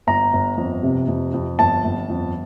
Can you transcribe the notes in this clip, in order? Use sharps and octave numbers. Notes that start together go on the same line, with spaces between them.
G1 A#5
G1
F2
C3
F2
F2
G1 A5
G1
F2